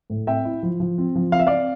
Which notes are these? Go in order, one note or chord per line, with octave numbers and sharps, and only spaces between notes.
A2
C4 E5 G5
E4
F3
F3
C4
F3
C4 F5
E5
C4 D5 F5